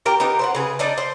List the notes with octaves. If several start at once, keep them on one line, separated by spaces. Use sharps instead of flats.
F#4 G4 A#4 G5
B3 D#4 G4 A#4
C5 C#5 F#5
C#3 G#4 B4
D4 D#4 D5 D#5
C5